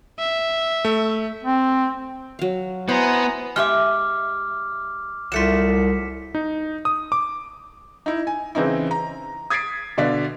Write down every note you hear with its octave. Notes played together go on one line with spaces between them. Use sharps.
E5
A3
C4
F#3 F5
B3 E4 C5 G#5 A#5
G#3 G4 E5 D6 F6
C2 F#3 A3 F4 B6 C#7 E7
D#4
D#6
D6
D#4 E4
G#5
C#3 E3 C4 D#4 E4
A#5
D#6 G#6 A6 B6 C7 D7
B2 D3 D5 F5 B6